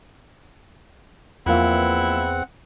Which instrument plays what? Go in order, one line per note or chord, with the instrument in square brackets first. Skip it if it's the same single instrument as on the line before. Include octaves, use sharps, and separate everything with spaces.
[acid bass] E2 [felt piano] F3 A#3 F5 [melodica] C4 F#5 [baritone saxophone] E4